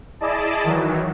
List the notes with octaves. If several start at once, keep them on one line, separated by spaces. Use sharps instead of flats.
E4 G#4 D5 D#5 A5
D#3 E3 F#3